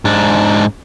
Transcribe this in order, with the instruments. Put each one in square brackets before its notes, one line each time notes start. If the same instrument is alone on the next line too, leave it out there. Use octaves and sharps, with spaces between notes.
[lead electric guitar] G#2 D4